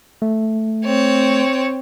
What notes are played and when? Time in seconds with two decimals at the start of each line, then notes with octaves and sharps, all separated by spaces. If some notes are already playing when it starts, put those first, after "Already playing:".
0.22 A3
0.85 C4 C#5